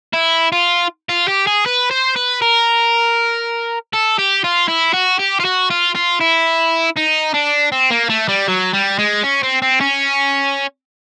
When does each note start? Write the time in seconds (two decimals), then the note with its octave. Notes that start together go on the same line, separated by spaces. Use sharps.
0.14 E4
0.52 F4
1.09 F4
1.28 G4
1.47 G#4
1.66 B4
1.91 C5
2.16 B4
2.42 A#4
3.93 A4
4.18 G4
4.44 F4
4.69 E4
4.94 F#4
5.19 G4
5.40 F4
5.45 F#4
5.70 F4
5.95 F4
6.20 E4
6.96 D#4
7.34 D4
7.72 C4
7.91 A#3
8.09 A3
8.29 G3
8.48 F#3
8.74 G3
8.99 G#3
9.23 C#4
9.43 C4
9.62 C4
9.81 C#4